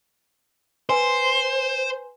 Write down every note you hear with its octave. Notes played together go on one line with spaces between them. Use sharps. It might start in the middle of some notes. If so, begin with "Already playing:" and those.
B4 C5 G#5 C6